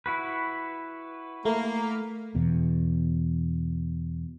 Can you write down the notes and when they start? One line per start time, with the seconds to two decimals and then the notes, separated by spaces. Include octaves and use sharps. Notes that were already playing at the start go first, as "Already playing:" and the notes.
0.06 E4 F#4 B4
1.45 A3 A#3
2.35 E2 B2